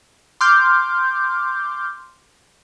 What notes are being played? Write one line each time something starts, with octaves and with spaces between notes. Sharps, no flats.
C6 D6 F6 G6